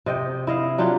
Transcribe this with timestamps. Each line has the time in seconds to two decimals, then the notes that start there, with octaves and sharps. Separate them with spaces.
0.06 C3 D#5 G5
0.47 E4 D#5 F5
0.78 F#3 D4 F4 G4